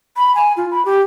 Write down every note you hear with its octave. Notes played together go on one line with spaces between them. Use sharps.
B5
G#5
F4
B5
G4